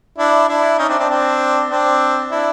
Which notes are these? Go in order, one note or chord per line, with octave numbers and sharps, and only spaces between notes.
D4 E4
D4 E4
C#4 D#4
C4 D4
C4 D4
C4 D4
C4 D4
D4 E4